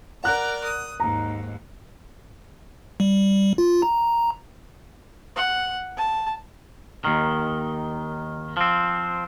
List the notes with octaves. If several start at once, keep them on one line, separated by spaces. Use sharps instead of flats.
A#4 D5 F#5 A#5 F#6
D#6
D#2 G#2 A#5
G3
F4
A#5
F#5
A5
D#2 D#3
F3 C4